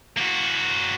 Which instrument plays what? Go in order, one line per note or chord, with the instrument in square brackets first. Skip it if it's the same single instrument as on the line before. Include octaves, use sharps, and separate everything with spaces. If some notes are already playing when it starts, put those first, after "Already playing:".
[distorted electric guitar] A#3 F#4